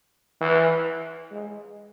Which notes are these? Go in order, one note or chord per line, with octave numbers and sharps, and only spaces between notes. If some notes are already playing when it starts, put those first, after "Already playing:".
E3
G#3